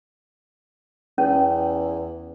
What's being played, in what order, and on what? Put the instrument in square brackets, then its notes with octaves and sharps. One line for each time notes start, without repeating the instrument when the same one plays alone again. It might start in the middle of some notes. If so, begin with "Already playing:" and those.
[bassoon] E2 [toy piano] C#4